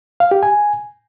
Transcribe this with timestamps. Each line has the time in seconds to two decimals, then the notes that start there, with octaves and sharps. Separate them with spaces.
0.20 F5
0.31 G4
0.43 G#5